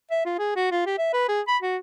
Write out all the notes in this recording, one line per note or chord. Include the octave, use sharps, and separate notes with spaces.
E5
F4
G#4
F#4
F4
G4
E5
B4
G#4
B5
F#4